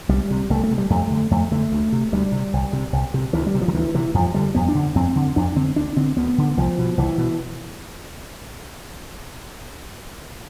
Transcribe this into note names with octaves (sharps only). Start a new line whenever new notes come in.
C2 G3
C3
C2 A3
A3
C3
G3
F2 A3
D3
F2 A3
D3 A3
D2
C3
D2 G3
C3
C2
C3
C2
C3
D2 E3
G3
C3
F3
D3
D2 E3
C3 E3
F2 F3
D3 G3
F2 B3
D4
D3
F2 C4
D3
F2 D4
D3 C4
D2 D4
D3 C4
D2 B3
D3
C2 F3
B2
C2 E3
B2